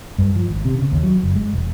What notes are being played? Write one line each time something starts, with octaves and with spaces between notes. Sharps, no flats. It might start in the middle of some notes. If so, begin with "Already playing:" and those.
G2
F3
G#1
C3
C#3
D#2
F#3
F#1
G#3
E1